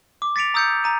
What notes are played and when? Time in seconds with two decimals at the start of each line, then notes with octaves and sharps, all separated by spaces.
0.22 D6
0.36 A6 B6 C#7 D7 F7
0.54 A#5 D#6 E6 G6 A6 C#7
0.84 A#5 D#7